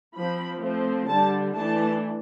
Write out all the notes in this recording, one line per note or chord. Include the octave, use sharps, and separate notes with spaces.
F3 C4 B5
F3 A3 C4
D3 G3 D4 A5
E3 A3 D4 A5